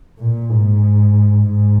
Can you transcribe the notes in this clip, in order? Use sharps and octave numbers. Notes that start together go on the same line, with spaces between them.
A#2
G#2
G#2